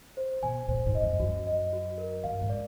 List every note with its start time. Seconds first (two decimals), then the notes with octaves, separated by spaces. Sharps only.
0.17 C5
0.43 B2 G#5
0.68 A#2 C5
0.86 G#2
0.95 D#5
1.02 F2
1.20 F#2 F#4
1.47 D#5
1.73 F#4
1.98 A#4
2.24 G2 F5
2.41 G#2
2.50 D5